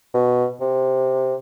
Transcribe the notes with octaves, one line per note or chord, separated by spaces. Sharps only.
B2
C3